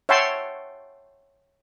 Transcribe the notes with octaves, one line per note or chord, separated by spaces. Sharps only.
C#5 E5 F#5 G5 A5 C6